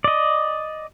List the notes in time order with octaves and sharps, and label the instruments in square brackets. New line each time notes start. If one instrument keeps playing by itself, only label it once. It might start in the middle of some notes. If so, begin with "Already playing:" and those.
[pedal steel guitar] D5 D#5